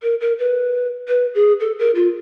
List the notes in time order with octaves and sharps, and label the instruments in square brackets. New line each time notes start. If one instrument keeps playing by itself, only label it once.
[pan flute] A#4
A#4
B4
B4
G#4
A4
A#4
F4